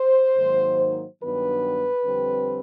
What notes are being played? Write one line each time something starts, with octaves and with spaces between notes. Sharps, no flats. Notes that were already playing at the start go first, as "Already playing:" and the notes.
Already playing: C5
G#2 D#3 F#3 A#3 D#4
G2 D#3 F#3 B3 D4 B4
F2 D3 G3 C4